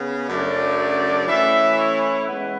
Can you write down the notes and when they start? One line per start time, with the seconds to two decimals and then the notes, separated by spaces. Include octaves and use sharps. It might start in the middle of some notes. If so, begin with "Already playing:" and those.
Already playing: C#3 B3
0.28 F#2 C#3 F#3 A3 D4 D5
1.28 E3 A3 C#4 E4 E5
1.77 C#5
2.26 G#3 B3 B4